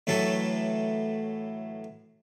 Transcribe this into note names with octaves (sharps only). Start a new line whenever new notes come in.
A2 E3 F#3 A4